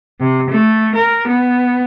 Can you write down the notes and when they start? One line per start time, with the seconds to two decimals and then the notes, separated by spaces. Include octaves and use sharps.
0.20 C3
0.50 A3
0.95 A#4
1.28 B3